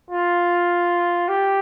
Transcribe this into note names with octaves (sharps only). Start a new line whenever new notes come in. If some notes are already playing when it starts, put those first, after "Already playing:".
F4
G4